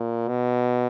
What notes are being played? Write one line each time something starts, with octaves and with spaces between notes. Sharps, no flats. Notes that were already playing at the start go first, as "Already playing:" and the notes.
Already playing: A#2
B2